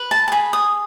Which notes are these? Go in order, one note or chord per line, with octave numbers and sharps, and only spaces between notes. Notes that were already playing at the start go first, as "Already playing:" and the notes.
Already playing: B4
A5
A5
G#4 B5
D#6